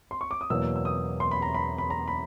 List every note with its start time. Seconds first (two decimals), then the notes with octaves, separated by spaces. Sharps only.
0.11 C6
0.21 C#6
0.31 D6
0.41 D#6
0.50 E2 B2 F#3 A#3 E6
0.76 E6
0.85 D#6
1.20 C6
1.31 B5
1.42 A#5
1.55 B5
1.78 B5
1.90 A#5
2.08 B5